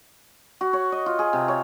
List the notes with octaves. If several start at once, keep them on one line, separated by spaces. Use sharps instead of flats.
F#4
C#5
D#5
F4
G#4
C3
C#5